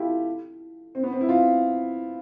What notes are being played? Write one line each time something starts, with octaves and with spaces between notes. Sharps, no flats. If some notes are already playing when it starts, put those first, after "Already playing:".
Already playing: E4 F4 G4 A4
C4
B3
C4
E4
F4